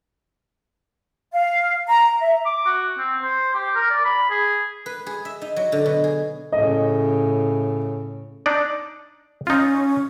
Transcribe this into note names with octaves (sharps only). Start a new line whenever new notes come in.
F5
A#5
E5
D6
F#4
C4
C5
G4
A#4
D5
B5
G#4
B4
G#4
E5
D#4
F#3
D3
B2
G#4
A2 C#3 D#5
D4 D#4 D5
C#4 D#4 F4